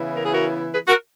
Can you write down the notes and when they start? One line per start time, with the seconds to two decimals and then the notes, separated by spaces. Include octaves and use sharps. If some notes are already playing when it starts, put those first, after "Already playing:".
Already playing: C#3 E3 B3 E4
0.15 A#4
0.24 G#4
0.33 F#4 A#4
0.73 G#4 B4
0.88 F#4 A#4